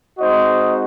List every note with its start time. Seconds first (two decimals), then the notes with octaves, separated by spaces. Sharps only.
0.19 G#3 C4 D#4 F#4 C5 D#5